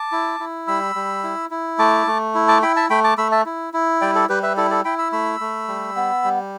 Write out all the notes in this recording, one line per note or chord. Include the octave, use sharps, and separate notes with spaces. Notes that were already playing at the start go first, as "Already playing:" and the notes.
Already playing: A5 D6
E4
E4
G3 B5 E6
G3
E4
E4
A3 A5 D6
A3
E4
A5 D6
E4 G5 B5
E5 A5
A3 G5 B5
A5 D6
A3 B5 E6
E5 A5
E4
E4
G3 D5 G5
A4 D5
G3 G4 B4
B4 E5
E4 A4 D5
A4 D5
E4 G5 B5
B5 E6
A3 B5 E6
A3
G3
B3
G3